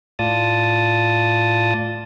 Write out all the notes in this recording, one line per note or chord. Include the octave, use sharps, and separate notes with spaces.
A2 F4 D5 A5 D#6